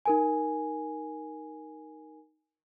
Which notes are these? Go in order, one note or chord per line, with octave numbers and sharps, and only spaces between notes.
D#4 A#4 G#5